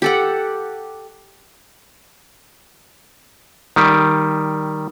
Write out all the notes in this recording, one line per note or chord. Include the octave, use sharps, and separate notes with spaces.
G4 A4 F#5
D#3 G3